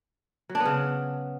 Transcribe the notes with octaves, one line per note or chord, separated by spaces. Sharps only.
F#3
D4
B3
C#3